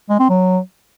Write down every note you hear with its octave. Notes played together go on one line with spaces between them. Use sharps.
G#3
C4
F#3